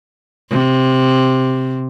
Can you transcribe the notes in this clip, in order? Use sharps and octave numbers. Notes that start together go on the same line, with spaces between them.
C3